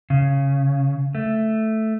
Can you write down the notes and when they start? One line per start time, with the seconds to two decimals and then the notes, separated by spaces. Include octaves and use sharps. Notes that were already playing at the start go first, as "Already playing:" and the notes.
0.10 C#3
1.15 A3